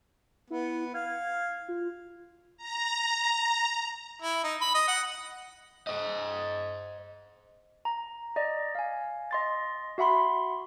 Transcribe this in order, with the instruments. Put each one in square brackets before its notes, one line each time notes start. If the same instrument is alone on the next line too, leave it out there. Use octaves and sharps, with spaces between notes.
[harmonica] B3 [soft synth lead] E4
[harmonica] F5 [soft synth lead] G#6
[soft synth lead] F4
[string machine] A#5
[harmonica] E4
D#4
B5
D#5
F#5
[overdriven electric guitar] C5 D#5
[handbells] A#5
D5 D#5
F5 G#5
D#5 C6 A6
F#4 E5 F#5 B5 C6